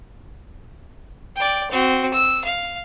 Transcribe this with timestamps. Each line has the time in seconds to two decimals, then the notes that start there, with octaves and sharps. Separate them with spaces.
1.36 D5 G5
1.71 C4 F#4
2.13 E6
2.44 F5